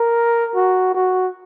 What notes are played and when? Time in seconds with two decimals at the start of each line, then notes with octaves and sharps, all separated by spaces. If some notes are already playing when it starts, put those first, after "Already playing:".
Already playing: A#4
0.56 F#4
0.95 F#4